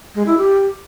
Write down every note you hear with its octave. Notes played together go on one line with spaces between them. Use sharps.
G#3
E4
G4